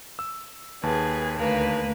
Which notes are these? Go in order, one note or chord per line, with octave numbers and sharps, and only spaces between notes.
E6
D#2 G#4 B4 A5
D2 A#3 B4